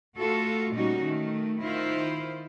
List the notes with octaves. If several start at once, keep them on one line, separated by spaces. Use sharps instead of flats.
A3 F4 F#4 A4
A#2 G3 C#4 D#4 F#4
D#3 A3
D#3 E4 F4 C5